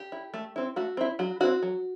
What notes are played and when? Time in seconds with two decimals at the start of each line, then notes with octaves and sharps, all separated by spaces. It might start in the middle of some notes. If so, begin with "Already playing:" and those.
Already playing: G4
0.12 E4
0.34 A3
0.56 C4 E4
0.76 A3 F#4
0.97 C4 E4
1.19 F#3 F#4
1.40 C4 E4 F#4
1.63 F#3